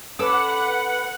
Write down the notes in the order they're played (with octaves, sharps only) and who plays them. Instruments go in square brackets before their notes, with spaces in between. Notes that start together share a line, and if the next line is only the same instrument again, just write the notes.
[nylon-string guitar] C#4 A4 [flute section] B4 [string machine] F#5 [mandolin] D6 E6